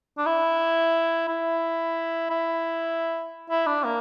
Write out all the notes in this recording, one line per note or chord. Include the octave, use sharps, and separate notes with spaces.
D4
E4
E4
E4
E4
D4
A#3